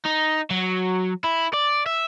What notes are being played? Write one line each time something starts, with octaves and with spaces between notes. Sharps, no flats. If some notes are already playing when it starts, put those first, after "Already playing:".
D#4
F#3
E4
D5
E5